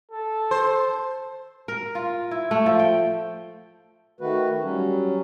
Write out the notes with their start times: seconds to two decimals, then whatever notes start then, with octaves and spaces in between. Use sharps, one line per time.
0.11 A4
0.51 C5
1.68 A#4
1.95 F4
2.31 E4
2.51 A3
2.66 F3
2.79 G5
4.21 D#3 A3 F#4 B4
4.62 F#3 G3 C#4